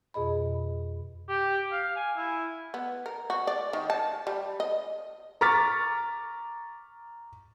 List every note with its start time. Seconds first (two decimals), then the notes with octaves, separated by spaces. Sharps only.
0.14 F2 B2 G#4 D#5 B5
1.29 G4
1.72 F5
1.96 G#5
2.16 E4
2.74 B3
3.06 A#4
3.30 F#4
3.47 D5
3.73 D#3
3.90 A5
4.27 G3
4.60 D#5
5.41 A#5 C#6 D6 F6 A6 B6